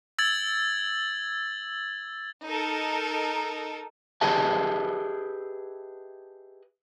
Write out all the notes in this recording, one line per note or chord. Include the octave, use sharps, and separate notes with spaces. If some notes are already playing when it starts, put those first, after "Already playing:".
E6 G#6 A6 F#7
D#4 A4 A#4
G4 G#4 B4 D#5 E5 A5